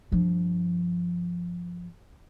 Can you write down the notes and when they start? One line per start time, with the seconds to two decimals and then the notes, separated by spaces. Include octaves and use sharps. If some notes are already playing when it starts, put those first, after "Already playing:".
0.12 G2 F3